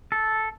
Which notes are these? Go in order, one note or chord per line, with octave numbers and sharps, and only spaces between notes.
A4